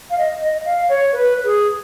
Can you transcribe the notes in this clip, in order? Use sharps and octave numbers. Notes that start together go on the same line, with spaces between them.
F5
D#5
D#5
F5
C#5
B4
G#4